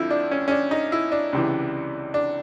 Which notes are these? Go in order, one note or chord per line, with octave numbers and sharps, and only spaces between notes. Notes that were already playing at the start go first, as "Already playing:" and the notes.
Already playing: F2 D3 F3 E4
D4
C#4
C#4
D4
D#4
E4
D4
C#2 C3 E3
D4